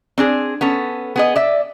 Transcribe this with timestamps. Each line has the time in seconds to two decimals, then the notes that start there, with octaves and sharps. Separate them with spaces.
0.18 C4 D4 G#4
0.61 B3 C#4 A4
1.16 B3 G#4 D#5
1.36 D5 E5